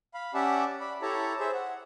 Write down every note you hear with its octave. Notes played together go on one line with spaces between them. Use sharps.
F5 B5
C#4 G4 D5 E5 F#5 A5
D5 B5
E4 G4 A4 C#5 A5 A#5
G#4 C5 E5
F#5